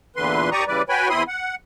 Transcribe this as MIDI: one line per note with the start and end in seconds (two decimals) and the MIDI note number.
0.16 0.50 40
0.16 0.50 46
0.16 0.50 50
0.16 0.50 52
0.16 0.50 71
0.16 0.50 84
0.52 0.64 39
0.52 0.64 67
0.52 0.64 74
0.52 0.64 82
0.52 0.64 85
0.52 0.64 87
0.67 0.82 49
0.67 0.82 52
0.67 0.82 55
0.67 0.82 71
0.67 0.82 74
0.89 1.09 66
0.89 1.09 71
0.89 1.09 73
0.89 1.09 79
0.89 1.09 80
0.89 1.09 83
1.09 1.23 40
1.09 1.23 60
1.09 1.23 64
1.09 1.23 83
1.09 1.23 84
1.09 1.23 87
1.28 1.55 78